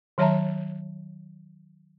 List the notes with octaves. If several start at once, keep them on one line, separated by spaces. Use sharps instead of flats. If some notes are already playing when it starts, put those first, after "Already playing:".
D#3 F#3 C#5 E5 A5 A#5